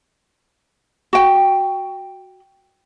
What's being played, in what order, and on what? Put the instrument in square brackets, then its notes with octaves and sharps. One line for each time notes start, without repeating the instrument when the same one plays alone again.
[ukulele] F#4 G5